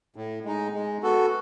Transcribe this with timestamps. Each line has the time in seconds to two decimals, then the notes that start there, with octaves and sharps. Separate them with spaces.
0.16 A2
0.45 G#3 D#4
0.74 G#3
1.03 B3 F#4 A4